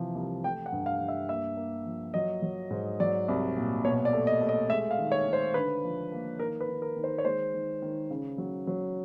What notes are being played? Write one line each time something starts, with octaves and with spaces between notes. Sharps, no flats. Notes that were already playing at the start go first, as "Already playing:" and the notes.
Already playing: C3 E3 F3
C2
A3 G5
F#5
G2
F5
G2
E5
A#3 E5
A#3
F3
F#3 D#5
F#3
G#2
F#3 D5
C2
A#2
B2 C#5
D5
A3
D#5
A3
D#5
G#3 E5
F5
D#3
C#5
D#3
C5
D3 B4
F3
A#3
D#3 A#4
B4
D#3
A#4
D#3
C5
C#5
G#3 C5
D#3
D#3
C#3
F#3
F#3